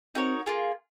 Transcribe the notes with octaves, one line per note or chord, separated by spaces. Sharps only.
C4 D#4 F#4 A#4 C#5
A#3 F4 G#4